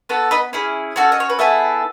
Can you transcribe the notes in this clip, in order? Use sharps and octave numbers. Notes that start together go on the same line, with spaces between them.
B3 F#4 A4
B4 D#5
C#4 E4 G#4
C#4 F#4 A4
D#5
C#5
B4
B3 E4 G#4 A4